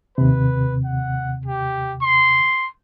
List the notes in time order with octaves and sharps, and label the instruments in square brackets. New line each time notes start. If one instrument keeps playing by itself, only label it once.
[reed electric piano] D#2 C3 [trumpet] B4
[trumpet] F#5
G4
C6